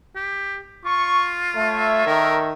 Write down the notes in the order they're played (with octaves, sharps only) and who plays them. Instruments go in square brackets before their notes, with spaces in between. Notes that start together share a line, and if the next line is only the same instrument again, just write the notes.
[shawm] G4
[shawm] F4 [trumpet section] C#6
[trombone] A3 [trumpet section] A4 C#5 E5
[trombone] D#3 [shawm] A#4